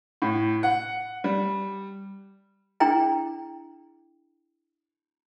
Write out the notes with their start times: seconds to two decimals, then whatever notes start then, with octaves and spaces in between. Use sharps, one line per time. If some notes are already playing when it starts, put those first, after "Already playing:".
0.22 A2
0.63 F#5
1.24 G3
2.80 D4 E4 G#4 G5 A#5